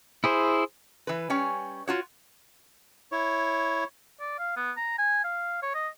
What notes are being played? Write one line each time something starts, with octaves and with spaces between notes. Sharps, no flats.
E4 G#4 C5
E3 B4
G3 C#4 C#5 G#5
F4 F#4 C#5
E4 C#5
D5
F5
B3
A#5
G#5
F5
C#5
D#5